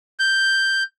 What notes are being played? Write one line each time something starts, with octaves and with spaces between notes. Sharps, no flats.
G6